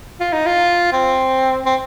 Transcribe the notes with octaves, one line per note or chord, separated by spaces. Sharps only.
F4
D#4
F4
C4
C4